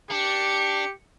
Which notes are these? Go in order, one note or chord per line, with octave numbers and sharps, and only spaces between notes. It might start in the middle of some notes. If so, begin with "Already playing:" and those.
D4 G4 C#7